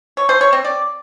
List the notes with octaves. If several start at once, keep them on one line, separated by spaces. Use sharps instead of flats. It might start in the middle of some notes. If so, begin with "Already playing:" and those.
C#5
C5
C#5
C4
D5